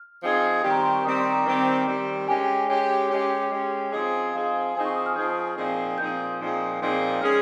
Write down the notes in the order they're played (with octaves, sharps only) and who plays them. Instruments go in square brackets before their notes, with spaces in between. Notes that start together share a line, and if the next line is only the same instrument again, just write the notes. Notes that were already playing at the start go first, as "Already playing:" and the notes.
Already playing: [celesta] F6
[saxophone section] F3 C4 D#4 G#4
D#3 G3 C4 G4
[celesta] A#5
C6
C#6
[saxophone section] D#3 G3 C4 G4 [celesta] D#6
[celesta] C6
A#5
[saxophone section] D#3 G3 C4 G4
D#3 G3 C4 G4
[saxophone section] G#3 C#4 G4 [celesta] G#5
[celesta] G5
G#5
[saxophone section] G#3 C#4 G4 [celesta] C#5
[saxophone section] G#3 C#4 G4 [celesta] C#5
[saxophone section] G#3 C#4 G4
F3 C4 D#4 G#4
[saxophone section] F3 C4 D#4 G#4 [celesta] F5
[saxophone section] F3 C4 D#4 G#4 [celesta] G#5
[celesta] C#6
D#6
F6
[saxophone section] F3 C4 D#4 G#4 [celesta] G6
[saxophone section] A#2 F3 C4 D#4 G#4
[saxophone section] A#2 F3 C4 D#4 G#4 [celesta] G6
[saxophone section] A#2 F3 C4 D#4 G#4
A#2 F3 C4 D#4 G#4
[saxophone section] G#3 C#4 G#4 [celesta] F6